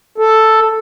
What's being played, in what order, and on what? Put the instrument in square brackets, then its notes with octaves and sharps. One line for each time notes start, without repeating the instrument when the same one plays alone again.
[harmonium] A4